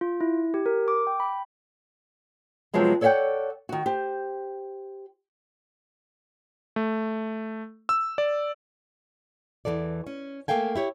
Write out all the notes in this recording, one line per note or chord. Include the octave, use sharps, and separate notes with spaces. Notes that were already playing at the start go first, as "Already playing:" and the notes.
F4
E4
G4
A#4
D6
G5
B5
C3 F3 F#3 G#3 B3
A4 C#5 D5 E5 F#5 G5
D#3 F#4
G4 C5
A3
E6
D5
E2 A#2 E3 A4 D5
C#4
A3 A#3 A4 F5 G5 G#5
E4 G4 C#5